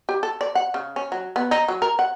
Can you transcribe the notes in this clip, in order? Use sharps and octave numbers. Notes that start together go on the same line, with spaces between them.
G4
A4
D5
F#5
C#3
C#4
F#3
B3
D#4
F#3
A#4
F#5